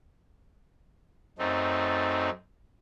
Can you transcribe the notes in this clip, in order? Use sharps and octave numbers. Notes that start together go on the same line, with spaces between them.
F#2 A3 C4 D#4